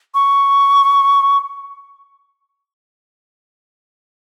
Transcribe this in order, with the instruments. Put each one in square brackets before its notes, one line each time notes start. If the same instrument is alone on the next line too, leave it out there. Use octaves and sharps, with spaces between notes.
[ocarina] C#6